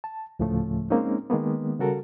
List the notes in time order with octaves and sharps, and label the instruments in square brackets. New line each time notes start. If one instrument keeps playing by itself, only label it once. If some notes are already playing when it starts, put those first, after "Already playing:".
[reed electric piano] A5
D2 A2 C#3 F3 A3
G#3 A#3 C4 C#4 D#4
D#3 G#3 A#3 B3
C#3 G3 F#4 A4 A#4